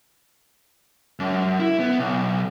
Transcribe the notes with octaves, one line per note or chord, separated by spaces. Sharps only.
F#2
E4
B3
B1